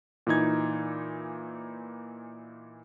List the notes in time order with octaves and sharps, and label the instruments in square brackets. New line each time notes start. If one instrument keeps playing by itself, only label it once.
[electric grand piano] A#2 E3 D#4 G#6